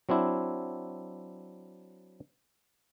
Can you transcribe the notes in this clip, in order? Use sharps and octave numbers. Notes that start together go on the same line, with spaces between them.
F#3 C4 D4 E4